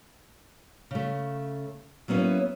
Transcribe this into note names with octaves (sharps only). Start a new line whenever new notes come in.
C#3 A3
F#3 A#3 B3 C#4 E4